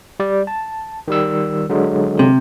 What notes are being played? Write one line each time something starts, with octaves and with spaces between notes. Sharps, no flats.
G3 D5
A5
D#3 G3 E6
D3 F#3 G#3
C3